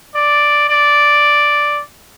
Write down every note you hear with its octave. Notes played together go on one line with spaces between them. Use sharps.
D5
D5